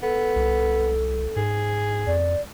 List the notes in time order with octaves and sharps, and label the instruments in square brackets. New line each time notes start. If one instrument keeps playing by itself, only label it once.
[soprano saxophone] B3 [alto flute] A4
[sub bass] C2
[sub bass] G#2 [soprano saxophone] G#4
[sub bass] F2 [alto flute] D5